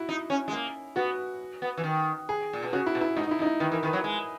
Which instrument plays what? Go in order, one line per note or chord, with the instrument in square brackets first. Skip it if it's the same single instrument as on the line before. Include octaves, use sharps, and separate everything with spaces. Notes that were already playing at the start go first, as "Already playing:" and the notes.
Already playing: [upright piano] E4 F#4
[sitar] D#4
C#4
G#3
A#3
[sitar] B3 [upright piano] F#4
[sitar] B3
E3
D#3
[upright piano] G#4
[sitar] A#2
B2
[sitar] C#3 [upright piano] F#4
[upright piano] E4
[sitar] B2
[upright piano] E4
[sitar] G#2 [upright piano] D#4
[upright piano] D#4
E4
[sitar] F#2
[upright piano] D#4
E4
[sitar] D#3 [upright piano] B4
[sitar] E3 [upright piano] A#4
[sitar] D#3
[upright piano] B4
[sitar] F#3
G#3